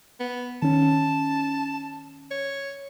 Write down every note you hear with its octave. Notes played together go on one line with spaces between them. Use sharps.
B3
D#3 C#4 A5
C#5